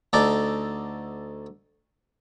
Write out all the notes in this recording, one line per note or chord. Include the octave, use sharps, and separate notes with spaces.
D2 D#4 A4 D5